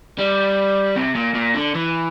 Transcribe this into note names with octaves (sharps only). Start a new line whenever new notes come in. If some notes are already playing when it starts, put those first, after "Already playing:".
G3
C3
A#2
A#2
D3
E3